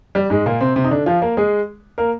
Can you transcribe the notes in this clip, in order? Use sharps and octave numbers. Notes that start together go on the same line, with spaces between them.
G3
G#2 G#3
A#2 A#3
C3 C4
C3 C4
D#4
D3 D4
F3 F4
A#3 A#4
G#3 G#4
A#3 A#4